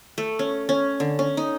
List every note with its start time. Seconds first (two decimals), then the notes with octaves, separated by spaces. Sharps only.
0.18 A3
0.39 C#4
0.69 C#4
1.00 D3
1.19 C#4
1.37 D#4